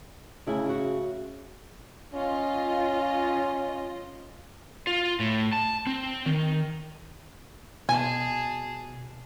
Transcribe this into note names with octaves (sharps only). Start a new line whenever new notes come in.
D2 C#3 E4 G#5
F#4 E5
C#4 F4 D#5
F4
A2
A5
C4
D#3
B2 G#4 G#5 A5